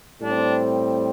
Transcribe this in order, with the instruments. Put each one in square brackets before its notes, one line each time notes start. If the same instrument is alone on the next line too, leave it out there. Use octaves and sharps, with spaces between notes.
[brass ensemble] A2 G3 C4 D4